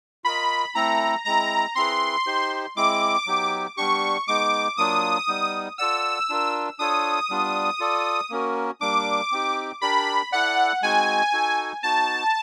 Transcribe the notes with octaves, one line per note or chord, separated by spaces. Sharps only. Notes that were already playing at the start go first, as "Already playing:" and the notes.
F4 A#4 D#5 B5
A3 C4 E4 A4 A#5
G#3 C4 E4 A#5
C4 E4 G#4 B4 C6
D#4 G4 C5
G#3 C4 E4 D6
F#3 B3 D#4 G4
G3 B3 D4 G4 C#6
G#3 B3 D#4 D6
F#3 A#3 D4 F4 D#6
G3 B3 D#4
F4 A4 D5 F#5 E6
D4 F4 A#4
D4 F4 A4 C#5 D#6
G3 B3 D4 F4
F4 A4 D5
A#3 C#4 F#4 A#4
G3 A#3 D4 D6
C4 D#4 G4
D4 G4 A#4 D5 B5
E4 A4 D5 F#5
G#3 C4 D#4 F#4 G#5
D#4 F#4 A4
B3 D#4 F#4 A5